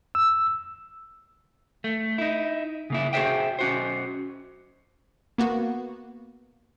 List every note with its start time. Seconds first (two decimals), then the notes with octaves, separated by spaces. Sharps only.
0.15 E6
1.84 A3
2.18 D#4 E4
2.90 C#3 A#3 E4
3.13 F#4 G#4 A#4 C5 E5 G5
3.59 C#4 F#4 C5
5.38 A#3 B3 F#4